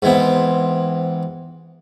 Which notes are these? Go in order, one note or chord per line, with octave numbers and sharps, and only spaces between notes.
G#2 E3 B3 C4